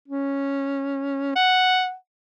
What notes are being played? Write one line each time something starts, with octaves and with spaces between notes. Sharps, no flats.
C#4
F#5